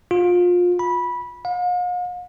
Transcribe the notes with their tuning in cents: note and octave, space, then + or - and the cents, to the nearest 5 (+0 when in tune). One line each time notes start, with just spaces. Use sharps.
F4 +25
B5 -15
F5 +45